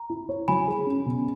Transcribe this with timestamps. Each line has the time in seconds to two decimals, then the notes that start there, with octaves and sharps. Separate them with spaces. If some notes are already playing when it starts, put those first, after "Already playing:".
Already playing: A#5
0.10 E4
0.29 C#5
0.48 F#3 G#5 B5
0.67 G#4
0.86 C#4
1.06 B2